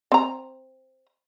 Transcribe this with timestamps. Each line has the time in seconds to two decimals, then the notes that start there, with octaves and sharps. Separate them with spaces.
0.12 C4 A#5